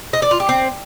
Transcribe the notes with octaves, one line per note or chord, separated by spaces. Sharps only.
D#5
D5
F4
G4
C4